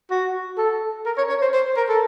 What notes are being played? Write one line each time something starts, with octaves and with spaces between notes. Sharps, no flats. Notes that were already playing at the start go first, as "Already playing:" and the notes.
F#4
A4
A#4
C#5
C#5
C5
C5
A#4
A4